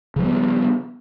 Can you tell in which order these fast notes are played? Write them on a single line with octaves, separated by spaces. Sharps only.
C#3 F3 G3 B3